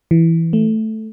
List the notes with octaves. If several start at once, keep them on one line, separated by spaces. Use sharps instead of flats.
E3
A3